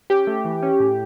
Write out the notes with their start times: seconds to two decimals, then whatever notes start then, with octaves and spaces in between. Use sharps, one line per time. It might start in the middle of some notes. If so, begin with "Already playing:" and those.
0.10 C#4 G4
0.27 A3
0.45 E3
0.62 C#4
0.80 A2